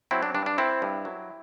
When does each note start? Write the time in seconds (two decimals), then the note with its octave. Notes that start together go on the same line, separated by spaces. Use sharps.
0.11 F#3 C4 E4
0.23 D4
0.35 G2 D4
0.46 D4
0.58 C4 E4
0.82 G2
1.05 F#3